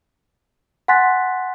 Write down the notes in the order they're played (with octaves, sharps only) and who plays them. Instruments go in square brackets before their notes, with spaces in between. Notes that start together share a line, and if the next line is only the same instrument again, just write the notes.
[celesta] F#5 G#5 C6 F#6 A6 B6